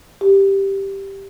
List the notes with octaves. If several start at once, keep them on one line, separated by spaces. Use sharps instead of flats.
G4